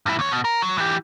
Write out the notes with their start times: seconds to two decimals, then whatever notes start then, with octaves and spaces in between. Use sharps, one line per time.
0.06 G2 E4
0.19 D#2 C#5
0.31 B2
0.45 A#4
0.62 F#3
0.78 E3 G4